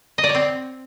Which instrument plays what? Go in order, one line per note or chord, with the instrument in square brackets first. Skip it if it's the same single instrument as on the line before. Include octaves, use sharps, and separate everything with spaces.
[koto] D#5
D5
C#5
C4